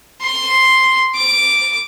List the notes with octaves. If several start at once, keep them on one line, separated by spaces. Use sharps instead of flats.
C6
D6